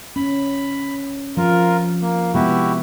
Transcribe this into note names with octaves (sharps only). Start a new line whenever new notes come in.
C#4 B5
F3 F4 A#4
A#3
C3 G#3 B3 E4 F#4 G4